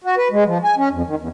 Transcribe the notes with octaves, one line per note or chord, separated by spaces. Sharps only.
F#4
B4
G#3
F3
G#5
C#4
F2
D#3
E2